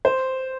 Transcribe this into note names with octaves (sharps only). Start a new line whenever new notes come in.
C5